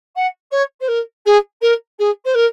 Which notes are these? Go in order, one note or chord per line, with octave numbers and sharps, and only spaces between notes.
F#5
C#5
C5
A#4
G#4
A#4
G#4
C5
A#4